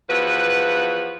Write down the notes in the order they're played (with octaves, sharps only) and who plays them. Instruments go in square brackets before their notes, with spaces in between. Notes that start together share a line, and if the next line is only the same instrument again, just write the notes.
[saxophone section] E2 F3 F#4 B4